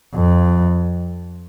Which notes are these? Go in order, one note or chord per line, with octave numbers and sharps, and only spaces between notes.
F2